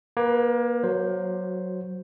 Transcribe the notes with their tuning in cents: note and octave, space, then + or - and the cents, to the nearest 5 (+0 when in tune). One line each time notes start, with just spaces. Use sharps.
A#3 +30 B4 +0
F#3 +0 F#4 -20 C5 +0